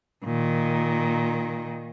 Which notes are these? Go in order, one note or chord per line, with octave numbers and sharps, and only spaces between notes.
A#2 D#3